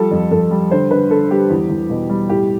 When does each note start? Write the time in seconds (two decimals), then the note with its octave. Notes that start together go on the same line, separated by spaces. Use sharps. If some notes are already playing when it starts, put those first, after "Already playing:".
Already playing: F3 G3 A4
0.11 F2
0.31 F2 A4
0.51 G3
0.71 D3 C5
0.91 D3 B4
1.10 D3 A4
1.31 G3 G4
1.50 E2
1.70 E2
1.90 B2
2.09 G3
2.29 A2 G4